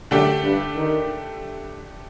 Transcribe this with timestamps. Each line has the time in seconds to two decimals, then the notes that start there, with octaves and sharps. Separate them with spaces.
0.11 F#2 D3 A3 D4 G4
0.43 G2
0.75 D#3